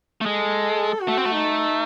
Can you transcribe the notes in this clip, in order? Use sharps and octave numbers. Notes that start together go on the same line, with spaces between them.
A3
G#3 A4
F#4
A3
C4
A3
D#4